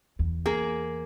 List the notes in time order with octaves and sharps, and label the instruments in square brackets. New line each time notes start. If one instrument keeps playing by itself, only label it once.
[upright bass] E2
[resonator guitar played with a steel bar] A#3 G#4